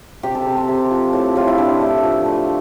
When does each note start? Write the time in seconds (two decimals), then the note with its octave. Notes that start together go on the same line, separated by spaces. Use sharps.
0.23 C3 G4
0.35 A4
0.46 C3
0.57 C4
0.68 C3
0.91 F3
1.13 A2
1.36 A2 F4
1.48 E4
1.58 A3 D4
1.81 A3
2.03 F3
2.25 A3